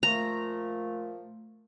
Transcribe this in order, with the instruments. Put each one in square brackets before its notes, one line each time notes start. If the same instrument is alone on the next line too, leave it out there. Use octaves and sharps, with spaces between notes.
[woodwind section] A#2 F3 A3 [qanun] A#5